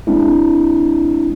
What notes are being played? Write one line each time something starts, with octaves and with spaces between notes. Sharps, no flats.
G#3 A#3 C4 D4 E4